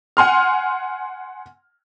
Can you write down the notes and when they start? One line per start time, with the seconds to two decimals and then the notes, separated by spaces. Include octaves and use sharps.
0.17 F#5 G#5 C6 F6